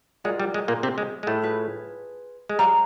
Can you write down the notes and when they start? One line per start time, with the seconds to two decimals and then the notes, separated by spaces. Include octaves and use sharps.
0.24 G#3 F4 A#4 D5 F#5
0.40 G3
0.54 G#3
0.68 A#2 A#3
0.83 C3 C4
0.98 G#3
1.23 G#3
1.27 A2 A3
1.42 F4 G#4 B4
2.49 G#3
2.59 G3 G#4 C#5 F5 A#5